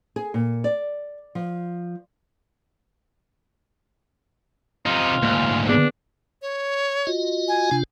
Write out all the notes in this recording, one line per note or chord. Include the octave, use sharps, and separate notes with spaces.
G#4
A#2
D5
F3
C3 D#4 F4
D2 G#2 A#3
B3 D4 G#4
C#5
F4 F#4 D#5
G#5
C3 D4 F4